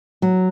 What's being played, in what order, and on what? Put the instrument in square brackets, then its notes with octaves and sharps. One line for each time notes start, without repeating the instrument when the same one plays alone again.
[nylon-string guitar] F#3